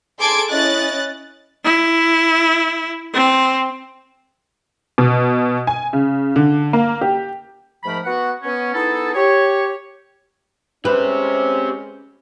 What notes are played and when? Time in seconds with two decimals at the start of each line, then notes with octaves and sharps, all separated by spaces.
0.19 G#4 A4 C6 D6 G#6 D7
0.50 C#4 E4 D#5 F#6 A6
1.64 E4
3.14 C4
4.98 B2
5.67 G#5
5.93 C#3
6.36 D3
6.73 A#3
7.01 G4
7.84 G#2 F3 A3 A#4 B5
8.05 B3 F#4 F#5
8.43 B3 C#4
8.74 B3 D#4 E4 G#4 A4
9.14 G4 C#5
10.85 G#3 C4 C#4 G4 B4 C5